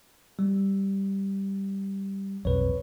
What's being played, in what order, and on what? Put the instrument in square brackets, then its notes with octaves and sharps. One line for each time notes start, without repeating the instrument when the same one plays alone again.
[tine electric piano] G3
[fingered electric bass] B1 F2 [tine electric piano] B4 C#5